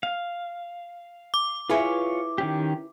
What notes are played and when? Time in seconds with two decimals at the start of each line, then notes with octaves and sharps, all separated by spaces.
0.03 F5
1.34 D6
1.70 E4 F4 G#4 B4 C#5
2.38 D#3 C#4 G4